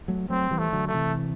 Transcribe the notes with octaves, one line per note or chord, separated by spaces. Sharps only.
F#3 A3
F#3 A3 C4
E3 G3
A3
D3 F#3
A3
C3 E3